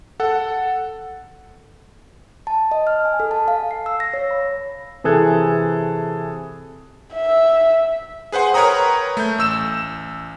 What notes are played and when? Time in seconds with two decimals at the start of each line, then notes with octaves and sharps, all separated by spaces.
0.20 A4 F#5
2.47 A5
2.72 D#5
2.87 F6
3.05 G#5
3.20 A4
3.31 A5
3.48 F5
3.71 C7
3.86 E6
4.00 A#6
4.14 C#5
4.31 B5
5.04 C3 E3 G#4 A4 F#6 G#6
7.13 E5
8.32 G#4 B4 C5 F#5 C6
8.54 A#4 B4 C#5 G5 A#5 D#6
9.17 A3 G6
9.38 A1 E6 E7